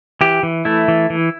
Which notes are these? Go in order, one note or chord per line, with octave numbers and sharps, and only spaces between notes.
E3 G4
E3
A3 E4
E3
E3